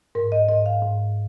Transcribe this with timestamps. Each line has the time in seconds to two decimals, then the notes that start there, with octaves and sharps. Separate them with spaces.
0.15 G#2 A#4
0.32 D#5
0.49 G#2 D#5
0.66 F5
0.83 G#2